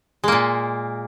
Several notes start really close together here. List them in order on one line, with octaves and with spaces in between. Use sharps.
G#3 A#3 A#2